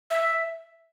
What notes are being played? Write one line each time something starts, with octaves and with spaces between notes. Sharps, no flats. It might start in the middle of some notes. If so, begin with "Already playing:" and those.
E5